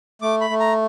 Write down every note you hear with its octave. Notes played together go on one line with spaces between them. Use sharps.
A3 D6
B5
A3
A#5